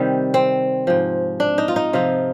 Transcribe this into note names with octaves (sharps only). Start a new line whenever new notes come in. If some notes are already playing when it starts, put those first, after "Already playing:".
Already playing: C3 D#3 G3
C4
G#2 F3
D4
D#4
F4
D#4
C3 F3 F4